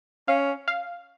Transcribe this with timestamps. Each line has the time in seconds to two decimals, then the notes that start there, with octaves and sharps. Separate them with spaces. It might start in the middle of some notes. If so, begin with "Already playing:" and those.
0.28 C#4 F5
0.68 F5